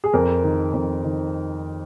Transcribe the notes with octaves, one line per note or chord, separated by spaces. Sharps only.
G#4
F2 A#4
D#3
F2
D#3